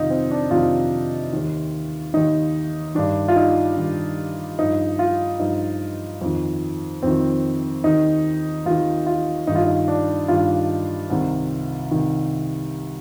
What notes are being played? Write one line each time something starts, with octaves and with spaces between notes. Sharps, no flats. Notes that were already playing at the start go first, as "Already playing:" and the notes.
Already playing: F2 C3 D#3 D#4 F4
C4
D4
F2 C3 D#3 F4
D#2 D#3
D#2 D#3 D#4
G2 D#3 D4
F4
D#4
G2 D#3
G2 F3 D#4
F4
G2 F3 D#4
F2 D#3
F2 D#3 C4
D#2 D#3 D#4
D#2 D#3 F4
F4
G2 D#3 D#4
F4
D#4
D4
G2 D#3 F4
C2 C3 D#3
C3 D#3